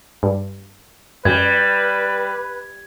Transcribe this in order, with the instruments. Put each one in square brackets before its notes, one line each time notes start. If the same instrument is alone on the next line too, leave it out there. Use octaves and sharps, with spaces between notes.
[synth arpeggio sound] G2
[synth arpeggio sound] F#2 [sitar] G3 [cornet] B4 [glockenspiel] G#6